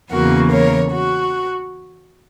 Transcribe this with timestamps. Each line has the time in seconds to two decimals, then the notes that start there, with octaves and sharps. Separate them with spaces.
0.12 E2 C#3 E3 A#3 F#4 A#4
0.51 A#4 C#5
0.91 F#4